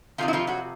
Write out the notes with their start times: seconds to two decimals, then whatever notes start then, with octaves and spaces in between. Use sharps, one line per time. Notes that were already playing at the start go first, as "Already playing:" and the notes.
0.18 F2 C3 D#3 F3 F4
0.28 E4
0.33 F3 F4
0.47 F#3 F#4